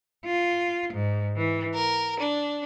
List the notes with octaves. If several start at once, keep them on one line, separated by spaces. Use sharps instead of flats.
F4
G#2
E3
A#4
D4